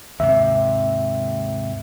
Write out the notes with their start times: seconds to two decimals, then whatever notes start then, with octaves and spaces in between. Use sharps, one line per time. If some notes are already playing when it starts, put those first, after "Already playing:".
0.20 D#2 G#2 C3 E5